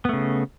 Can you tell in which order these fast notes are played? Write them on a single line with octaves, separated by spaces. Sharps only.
B3 A3 C#3